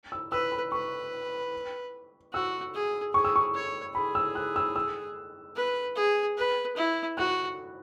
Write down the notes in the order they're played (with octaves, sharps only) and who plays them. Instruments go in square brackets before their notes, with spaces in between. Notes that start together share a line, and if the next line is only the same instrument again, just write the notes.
[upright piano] E6
[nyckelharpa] B4 [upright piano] E6
[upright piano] B5
[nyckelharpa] B4 [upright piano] C#6
[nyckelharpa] F#4 [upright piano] E6
[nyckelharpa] G#4
[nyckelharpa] G#4 [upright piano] C#6
[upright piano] E6
C#6
[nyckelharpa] C#5
[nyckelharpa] G#4 [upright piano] B5
[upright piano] E6
F#6
E6
E6
[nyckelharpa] B4
G#4
B4
E4
[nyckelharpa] F#4 [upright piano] F#6